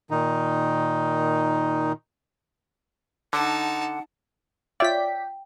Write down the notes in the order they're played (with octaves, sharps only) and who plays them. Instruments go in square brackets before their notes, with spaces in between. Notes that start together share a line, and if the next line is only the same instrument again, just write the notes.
[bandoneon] A#2 D#3 D#4
[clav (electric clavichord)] D3 [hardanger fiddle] D#4 A5 [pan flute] F#5
[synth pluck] F4 C#5 E5 [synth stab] D5 B6 [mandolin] G5